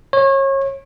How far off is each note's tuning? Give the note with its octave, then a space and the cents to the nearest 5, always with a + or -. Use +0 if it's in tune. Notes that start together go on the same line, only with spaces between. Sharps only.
C#5 -30